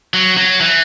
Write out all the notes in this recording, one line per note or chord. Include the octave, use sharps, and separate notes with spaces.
F#3
F#3
E3